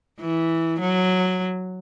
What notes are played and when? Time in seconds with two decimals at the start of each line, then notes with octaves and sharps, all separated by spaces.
0.20 E3
0.80 F#3